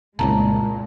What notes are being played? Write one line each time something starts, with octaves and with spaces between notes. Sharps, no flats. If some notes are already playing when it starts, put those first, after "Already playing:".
F1 C2 A#2 C#3 G#3 A5 A#5